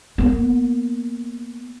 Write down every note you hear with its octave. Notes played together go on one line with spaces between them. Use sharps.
A#3 B3